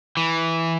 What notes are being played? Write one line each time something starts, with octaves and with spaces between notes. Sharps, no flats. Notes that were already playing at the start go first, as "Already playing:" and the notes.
E3